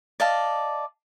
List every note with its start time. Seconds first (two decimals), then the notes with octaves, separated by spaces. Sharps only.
0.20 D5 D#5 F5 A5